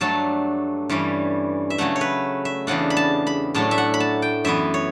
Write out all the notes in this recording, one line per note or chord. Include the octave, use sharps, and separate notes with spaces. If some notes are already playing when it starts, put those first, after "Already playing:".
G2 F#3 A3 D4 A5
G2 E3 G3 C#4
E5
C#3 F#3 A3 F#5
C#5
B4
E5
E2 C#3 G3 D4 F#5
B5
A5
B5
A2 F#3 A3 D4 A5
E5
F#5
B5
A5
G5
F#2 E3 B3 E5
C#5